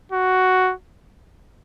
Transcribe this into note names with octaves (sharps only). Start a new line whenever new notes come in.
F#4